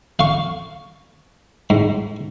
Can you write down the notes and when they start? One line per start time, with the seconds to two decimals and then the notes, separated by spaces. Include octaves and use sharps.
0.19 F5 C#6
1.70 G#2